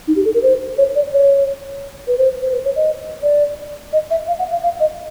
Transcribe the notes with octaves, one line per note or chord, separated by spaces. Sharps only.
D#4
G4
A4
A#4
C5
C#5
D5
C#5
B4
C5
C5
B4
C#5
D#5
D5
D#5
E5
F5
F#5
F5
F5
D#5